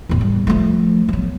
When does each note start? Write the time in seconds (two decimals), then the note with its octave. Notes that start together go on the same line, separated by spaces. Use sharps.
0.09 E2 A2
0.21 G3
0.47 F3 A3
1.09 F#3 B3